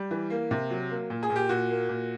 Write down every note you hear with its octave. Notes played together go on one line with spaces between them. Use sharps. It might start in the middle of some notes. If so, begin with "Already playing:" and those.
Already playing: G3
E3
A#3
C3
F#3
A#3
A#2
G#4
A#2
G4
A#2 F#4
A#3
A#2